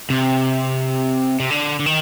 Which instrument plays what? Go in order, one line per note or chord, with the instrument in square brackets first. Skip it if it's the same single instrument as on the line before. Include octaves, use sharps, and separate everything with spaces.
[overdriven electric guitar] C3
C3
D3
D3
D#3